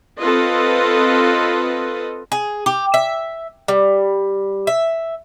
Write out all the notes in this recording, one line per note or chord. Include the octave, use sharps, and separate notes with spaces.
C4 F4 A4 B4 D#5
G#4
G4
E5
G3
E5